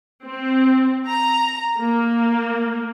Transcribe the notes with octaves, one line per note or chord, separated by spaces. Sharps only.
C4
A#5
A#3